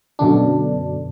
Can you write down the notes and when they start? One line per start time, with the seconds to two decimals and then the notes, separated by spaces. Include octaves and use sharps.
0.19 F#2 B2 D3 D4